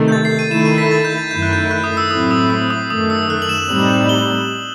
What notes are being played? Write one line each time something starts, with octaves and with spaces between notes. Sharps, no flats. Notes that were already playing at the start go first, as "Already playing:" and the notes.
Already playing: C3 D#3 A3
G6
A6
C7
D#7
D#3 A3 E4 E7
D#7
B6
A6
G6
A6
F#2 D#3 A3 E4 G6
F#6
G6
F#6
D#6
E6
A2 F#3 A3 C4 E4 D#6
D#6
E6
D#6
F#2 D#3 A3 D#6
E6
F#6
F#7
E7
A2 G3 C4 D#4 F#7
G7